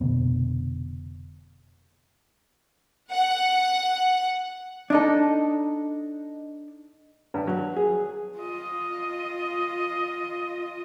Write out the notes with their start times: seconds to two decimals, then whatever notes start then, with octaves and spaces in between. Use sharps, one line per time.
0.01 F1 B2 D3 B3
3.12 F#5
4.90 D4 D#4 A4
7.34 G2
7.47 F#3
7.77 G#4
8.37 F4 D#5